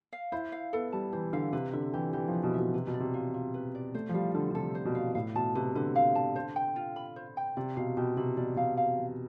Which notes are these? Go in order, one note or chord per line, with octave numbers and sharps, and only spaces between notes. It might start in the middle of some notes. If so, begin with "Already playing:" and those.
F5
E4 C5
F5
B3 A4
G3 A5
E3 C5
D3 F5
C3 B4
D3 E5
E3 G4
E3 G4
F3
B4
B2
E5
B2
C3 B4
B2
D5
C3
F4
F4
B4
D5
A3 C5
F3
G3 F5
D3 A4
D3
C3 A4
C5
B2
F5
A2 F5
B2 A5
C3 B4
D3 B4
F5
A5
C5
G5
F4
B5
C5
G5
C3 D5
B2 F5
B2 G4
C3 B5
B2 D5
B2 F5
F5